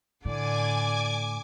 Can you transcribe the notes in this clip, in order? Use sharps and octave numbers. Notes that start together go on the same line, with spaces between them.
A2 D3 D5 G#5 D6 G#6